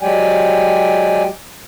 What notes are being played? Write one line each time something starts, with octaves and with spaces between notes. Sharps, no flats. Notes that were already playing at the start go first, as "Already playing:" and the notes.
F#3 G#3 G4 D5 G5 G#5